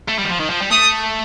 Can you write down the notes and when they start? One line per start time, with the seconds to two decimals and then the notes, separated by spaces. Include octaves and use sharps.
0.08 A3
0.18 G3
0.24 D#3
0.29 F3
0.40 D#3
0.50 F3
0.60 G3
0.71 A3 D#6